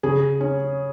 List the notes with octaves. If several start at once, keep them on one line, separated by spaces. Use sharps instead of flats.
C#3 G#4
C#4